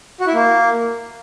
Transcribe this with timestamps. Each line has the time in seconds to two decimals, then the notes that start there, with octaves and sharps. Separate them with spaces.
0.20 F#4
0.27 E4
0.34 A#3